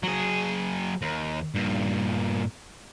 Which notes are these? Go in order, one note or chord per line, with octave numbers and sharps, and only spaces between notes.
F#3 G#4
D#2
G2 A#2